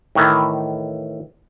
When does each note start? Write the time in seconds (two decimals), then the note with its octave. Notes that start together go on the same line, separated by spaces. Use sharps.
0.15 A2 D#3 E3